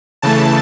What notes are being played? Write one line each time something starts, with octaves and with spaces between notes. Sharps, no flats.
C#3 E3 A3 A5